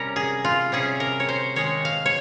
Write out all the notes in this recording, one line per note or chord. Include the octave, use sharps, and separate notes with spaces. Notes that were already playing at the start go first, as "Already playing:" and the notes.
Already playing: C3 G3 C#4 A#4
G#4
F4
C3 G3 C#4 G#4
A#4
C#5
C5
C3 D#3 G#3 C#5
F5
C#5